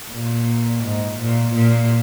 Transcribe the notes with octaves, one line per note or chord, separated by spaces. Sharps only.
A#2
G#2
A#2
A#2